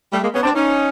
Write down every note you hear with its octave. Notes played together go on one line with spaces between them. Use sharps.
G3 A3
G#3 A#3
B3 C#4
C4 D4
C#4 D#4